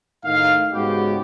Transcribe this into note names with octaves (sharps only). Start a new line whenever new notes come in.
A2 D#3 D#4 F5
G#2 C#3 G#3 B3 F#4 G4